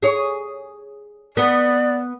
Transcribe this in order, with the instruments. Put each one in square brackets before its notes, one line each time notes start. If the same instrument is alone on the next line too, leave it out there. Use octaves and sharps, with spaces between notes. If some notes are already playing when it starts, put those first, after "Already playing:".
[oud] G#4 C#5
[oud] B3 [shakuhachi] D5